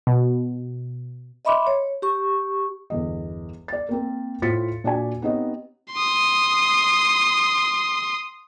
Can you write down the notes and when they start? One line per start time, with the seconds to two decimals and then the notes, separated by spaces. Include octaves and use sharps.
0.07 B2
1.45 D#5 E5 B5 C6 D6
1.67 C#5
2.02 G4 C#6
2.90 G1 E2 D#5
3.68 D5 A6
3.89 A#3 C4 A#4
4.42 A2 F4 C5 A6 B6 C#7
4.84 A#2 D4 F#4 D5 G#5
5.22 B3 C4 D#4 G4 C#5 D#5
5.93 C6 D#6